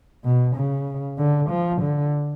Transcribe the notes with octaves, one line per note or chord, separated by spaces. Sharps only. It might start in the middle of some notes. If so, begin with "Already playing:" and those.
B2
C#3
D3
F3
D3